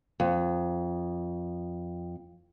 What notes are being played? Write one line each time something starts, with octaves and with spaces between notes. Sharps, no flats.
F2